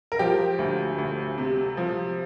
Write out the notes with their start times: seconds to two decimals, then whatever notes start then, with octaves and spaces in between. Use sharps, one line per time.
0.12 A#4
0.19 F3 G4
0.59 D2
0.98 D2
1.38 C3
1.77 F3